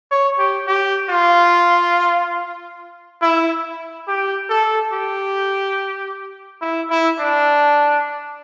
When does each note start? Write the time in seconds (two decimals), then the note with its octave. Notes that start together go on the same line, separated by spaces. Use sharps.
0.11 C#5
0.39 G4
0.68 G4
1.10 F4
3.22 E4
4.08 G4
4.50 A4
4.93 G4
6.62 E4
6.90 E4
7.19 D4